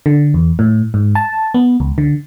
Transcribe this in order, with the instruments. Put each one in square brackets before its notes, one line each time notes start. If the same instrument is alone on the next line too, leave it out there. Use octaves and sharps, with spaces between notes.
[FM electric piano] D3
E2
A2
G#2
A5
B3
C#2
D3